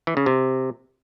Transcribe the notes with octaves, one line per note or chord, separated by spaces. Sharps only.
E3
C#3
C3